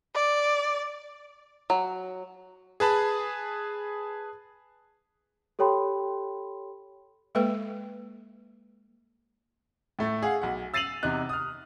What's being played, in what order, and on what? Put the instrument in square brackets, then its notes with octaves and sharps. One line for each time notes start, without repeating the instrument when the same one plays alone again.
[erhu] D5
[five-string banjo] F#3
[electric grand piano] G#4 B4 A5 B5
[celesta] G4 A4 C#5 G5 B5 C6
[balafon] G#3 A#3 A4 B4 G5
[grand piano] A2 A3
G#4 F5 F#5
B1 F#5
E6 A6 C7 D#7 F7 F#7
E2 C3 D#4 F#6
D#6 F6